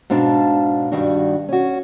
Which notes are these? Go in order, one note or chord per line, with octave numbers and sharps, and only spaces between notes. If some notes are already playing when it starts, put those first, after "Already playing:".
G#2 B2 D4 F5 A5
G2 D#3 G3 F#4
C#4 F#4